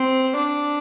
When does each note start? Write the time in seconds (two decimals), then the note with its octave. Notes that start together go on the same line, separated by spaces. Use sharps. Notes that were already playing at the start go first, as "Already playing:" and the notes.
Already playing: C4
0.36 D4